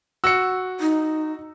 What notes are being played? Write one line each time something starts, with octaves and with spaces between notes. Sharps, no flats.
F#4 E6 C#7
D#4